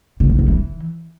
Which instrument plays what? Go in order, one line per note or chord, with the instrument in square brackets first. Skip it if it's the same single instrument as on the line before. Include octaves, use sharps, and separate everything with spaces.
[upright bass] C#3
D3
C#3
E3